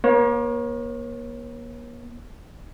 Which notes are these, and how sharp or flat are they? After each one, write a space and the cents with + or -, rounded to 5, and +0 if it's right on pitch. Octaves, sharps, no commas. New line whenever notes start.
A#3 +35 C#5 -30